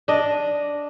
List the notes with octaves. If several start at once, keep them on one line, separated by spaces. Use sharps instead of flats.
D4 D#5